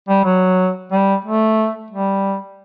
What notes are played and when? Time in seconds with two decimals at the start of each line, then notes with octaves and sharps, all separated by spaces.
0.09 G3
0.24 F#3
0.91 G3
1.25 A3
1.90 G3